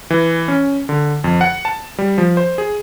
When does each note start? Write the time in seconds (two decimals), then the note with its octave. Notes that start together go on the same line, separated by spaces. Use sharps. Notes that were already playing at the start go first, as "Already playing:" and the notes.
0.10 E3
0.48 C#4
0.89 D3
1.24 F2
1.41 F#5
1.65 A5
1.99 G3
2.18 F3
2.37 C5
2.58 G#4